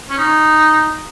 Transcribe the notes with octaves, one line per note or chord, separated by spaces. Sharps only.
C#4
D#4